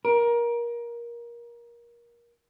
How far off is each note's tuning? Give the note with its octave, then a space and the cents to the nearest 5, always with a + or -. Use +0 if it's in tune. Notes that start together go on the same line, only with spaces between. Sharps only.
A#4 +25